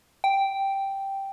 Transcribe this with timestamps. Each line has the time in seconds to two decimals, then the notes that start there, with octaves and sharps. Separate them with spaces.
0.24 G5